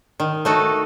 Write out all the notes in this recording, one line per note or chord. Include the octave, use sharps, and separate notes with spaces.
D#3
A3 D#4 F#4 A4